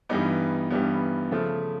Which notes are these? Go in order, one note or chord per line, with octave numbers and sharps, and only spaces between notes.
G2 E3 G3 B3 D#4
G2 E3 G3 B3
C#3 F3 A3